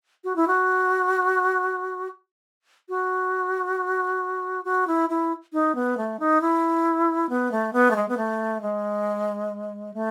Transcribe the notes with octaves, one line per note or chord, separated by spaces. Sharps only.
F#4
E4
F#4
F#4
F#4
E4
E4
D#4
B3
A3
D#4
E4
B3
A3
B3
A3
G#3
B3
A3
G#3
A3